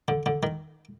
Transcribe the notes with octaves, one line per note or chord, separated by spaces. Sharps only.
D3
D3
D#3